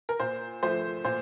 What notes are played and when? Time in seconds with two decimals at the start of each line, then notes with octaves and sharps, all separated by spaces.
0.09 A#4
0.20 A#2 C5
0.63 F3 A3 C5
1.05 A#2 C5